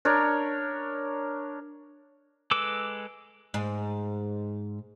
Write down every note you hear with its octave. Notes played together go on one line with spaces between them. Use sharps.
D4 A#4 C#5
G#3 A4 B4 D6 E6
G#2